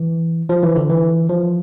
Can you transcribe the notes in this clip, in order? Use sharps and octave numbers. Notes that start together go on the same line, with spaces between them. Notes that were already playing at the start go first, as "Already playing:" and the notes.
Already playing: E3
F3
E3
D3
E3
F3